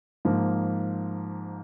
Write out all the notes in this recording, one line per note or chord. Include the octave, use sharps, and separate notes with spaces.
G#2 F3 A#3